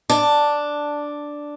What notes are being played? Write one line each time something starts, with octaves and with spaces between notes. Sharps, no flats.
D4